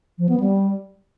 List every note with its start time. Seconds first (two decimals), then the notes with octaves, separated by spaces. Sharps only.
0.18 F3
0.29 B3
0.40 G3